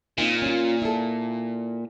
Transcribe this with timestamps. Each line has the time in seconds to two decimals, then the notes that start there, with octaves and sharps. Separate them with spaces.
0.18 A#2 C4 D#4 F4
0.42 C#4 F4
0.82 E4 A4